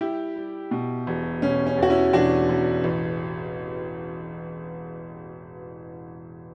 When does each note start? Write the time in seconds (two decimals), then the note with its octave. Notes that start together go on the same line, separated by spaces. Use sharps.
0.01 G3 E4 G4
0.36 G3
0.71 B2
1.07 E1
1.42 B2 C#4
1.67 C#4
1.77 E2
1.83 F#4
1.90 C#4 E4
2.13 E1 D4 F#4
2.49 E1
2.84 A1